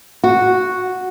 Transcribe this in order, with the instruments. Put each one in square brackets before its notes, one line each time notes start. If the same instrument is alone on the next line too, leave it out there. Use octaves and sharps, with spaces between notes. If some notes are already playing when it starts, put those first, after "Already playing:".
[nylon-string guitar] F#4